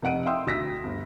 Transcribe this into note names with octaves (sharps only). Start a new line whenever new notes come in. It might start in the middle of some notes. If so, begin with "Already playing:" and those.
F1 D#5 F#5 D7 D#7
E5 F5 G5 C6 D#6 E6
D2 E6 A#6 B6
G1